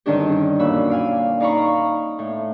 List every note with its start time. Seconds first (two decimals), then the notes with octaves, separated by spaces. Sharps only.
0.06 G2 D3 D#3 C#4 D4 G4
0.59 F#2 A#2 F#4 B5 E6
0.90 D5 F5 G#5
1.40 D#4 D5 F5 A#5 B5 C#6
2.19 A2